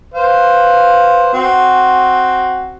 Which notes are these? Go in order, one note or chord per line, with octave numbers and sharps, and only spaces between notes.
B4 C5 F5
C4 F#4